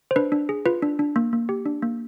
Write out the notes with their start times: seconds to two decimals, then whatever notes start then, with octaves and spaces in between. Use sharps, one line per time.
0.11 C5
0.16 D4 B4
0.32 D4
0.49 G#4
0.66 F4 B4
0.82 D4
0.99 D4
1.16 A#3
1.33 A#3
1.49 G4
1.66 D4
1.82 A#3